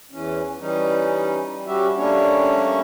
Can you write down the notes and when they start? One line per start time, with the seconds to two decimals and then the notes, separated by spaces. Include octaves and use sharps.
0.11 E2 E3 C#4
0.60 E3 G3 C#4 D#4
1.52 G3
1.66 G3 C#4 F#4 G4 E5
1.97 G3 A3 A#3 C#4 D4 C#5